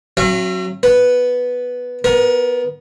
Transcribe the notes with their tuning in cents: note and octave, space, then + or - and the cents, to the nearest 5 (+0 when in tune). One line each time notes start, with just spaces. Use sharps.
F#3 +0 C#4 -45 E5 +45
B3 +0 B4 +0
B3 +0 A#4 +25